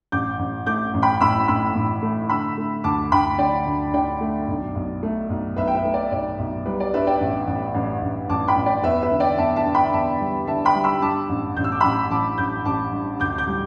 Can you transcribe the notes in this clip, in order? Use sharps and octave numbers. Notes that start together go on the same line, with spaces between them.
A1 D6 G6
A1
A3 D6 G6
A1
G5 B5
A2 B5 E6
A2 B5 E6
A2
A3
D3 B5 E6
A3
D2 A5 D6
D2 G5 B5
D3 D5 G5
D2
D3 D5 G5
A3
B1
B1
A3
B1
B1 B4 E5
G5
B4 E5
A3
D5
B1 D5
B1
G3 B4
D5
G2 B4 E5
D5 G5
A1
A1
A1
A1
A1 A5 D6
G5 B5
A1
D5 G5
E2 B4 E5
B4 E5
D3
D5 G5
E2 E5 A5
E5 A5
D3
G5 B5
E2 E5 A5
G3
D3 E5 A5
G5 B5
G3
B5 E6
G2 A5 D6
A1
A1 G6
E6
D6
A1 B5 E6
A1 A5 D6
A1 D6 G6
A1 A5 D6
G2
D2 D6 G6
D6 G6
G3